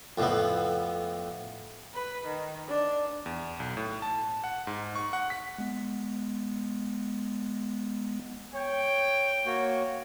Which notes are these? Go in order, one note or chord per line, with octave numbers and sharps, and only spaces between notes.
F2 A2 B3
B4
D#3
D4
E2
B1
A2
A5
F#5
G#2
C#6
F#5
B6
G#3 B3
C#5 G5
A#3 F#4 C#5